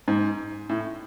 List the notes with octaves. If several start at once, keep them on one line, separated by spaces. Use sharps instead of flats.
G#2
A2